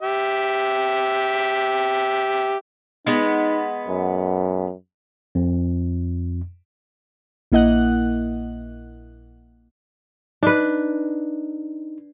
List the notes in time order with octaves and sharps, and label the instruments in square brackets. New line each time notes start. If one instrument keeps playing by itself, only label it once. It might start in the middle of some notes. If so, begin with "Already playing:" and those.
[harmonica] G4 E5
[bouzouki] G#3 B3 [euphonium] D#4
[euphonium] F#2
[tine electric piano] F2
[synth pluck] A#1 A#3 E4 D#5 F#5 F#6
[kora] D4 B4 [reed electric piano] D#4